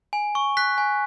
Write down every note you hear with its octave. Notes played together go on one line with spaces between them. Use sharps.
G#5
C#6
F#6 B6
G#5